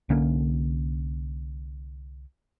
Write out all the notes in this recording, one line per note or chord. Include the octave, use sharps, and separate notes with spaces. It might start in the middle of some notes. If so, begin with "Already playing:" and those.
C2 D3 A#3 C#4